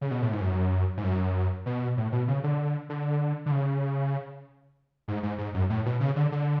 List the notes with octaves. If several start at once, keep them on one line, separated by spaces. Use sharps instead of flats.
C#3
B2
A2
G#2
F#2
G#2
F#2
B2
A2
B2
C#3
D3
D3
D3
C#3
G#2
G#2
G#2
F#2
A2
B2
C#3
D3
D3